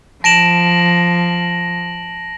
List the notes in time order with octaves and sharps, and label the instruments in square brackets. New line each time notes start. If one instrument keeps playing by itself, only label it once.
[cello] F3 [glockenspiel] A5 D7 E7 [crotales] A#6 F#7